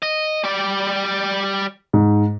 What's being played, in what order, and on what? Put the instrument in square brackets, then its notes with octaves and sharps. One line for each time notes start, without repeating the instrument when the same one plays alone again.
[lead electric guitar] D#5
G3 D5
[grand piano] G#2